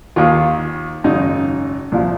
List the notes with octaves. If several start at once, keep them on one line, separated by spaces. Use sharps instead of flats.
D#2 D#3 F4
G#1 F#2 C#3 D#4
C2 A#2 F3